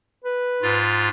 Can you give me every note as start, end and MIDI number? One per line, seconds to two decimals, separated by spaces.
0.24 0.77 71
0.62 1.09 44
0.62 1.09 65